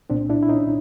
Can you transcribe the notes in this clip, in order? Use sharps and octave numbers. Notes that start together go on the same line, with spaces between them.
C2 A#2 C4 D4
D4 E4
E4
C#4 D#4